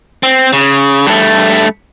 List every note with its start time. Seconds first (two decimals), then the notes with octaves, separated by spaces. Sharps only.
0.23 C4
0.53 C#3
1.07 G2 A3